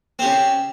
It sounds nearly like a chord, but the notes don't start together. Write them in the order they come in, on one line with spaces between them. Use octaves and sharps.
C4 G4 C#3